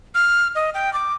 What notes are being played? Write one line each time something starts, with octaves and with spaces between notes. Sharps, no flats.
F6
D#5
G5
D6